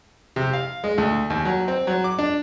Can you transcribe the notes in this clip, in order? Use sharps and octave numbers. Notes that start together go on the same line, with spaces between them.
C3
F5
G#3
D2
D#2
F#3
C4
F#3
D6
D4